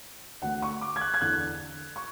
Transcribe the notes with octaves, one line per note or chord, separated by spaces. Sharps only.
D2 D3 F#5
C#6
D6
G#6
F#6
G#6
E2 D3 F#6
C#6